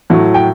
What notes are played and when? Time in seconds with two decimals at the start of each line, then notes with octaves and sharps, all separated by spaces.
0.10 A2 F#3 A3
0.34 G5